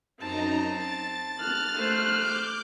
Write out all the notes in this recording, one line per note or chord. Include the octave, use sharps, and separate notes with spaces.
F#2 C4 D#4 A5 A#5
A6
F6 F#6
A3 C5
D6 G6